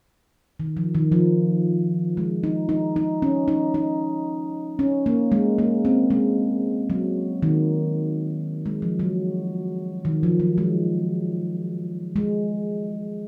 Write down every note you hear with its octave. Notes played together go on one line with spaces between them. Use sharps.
D#3
F3
D#3
F3
G#3
D#4
D#4
D#4
C#4
D#4
D#4
C#4
A#3
G#3
A#3
C4
G#3
F#3
D#3
G#3
F3
F#3
D#3
F3
F#3
G#3
G#3